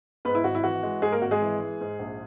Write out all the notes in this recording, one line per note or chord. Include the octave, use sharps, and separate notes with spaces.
G#2 B3 B4
E4
G#1 F#4
E4
E3 F#4
G#3
G#2 G#3 G#4
A#3 A#4
G#1 F#4
G#3 G#4
E3
G#3
G#2
A#1